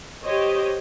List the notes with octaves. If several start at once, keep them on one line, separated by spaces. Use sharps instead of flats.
G4 C5 C#5 D#5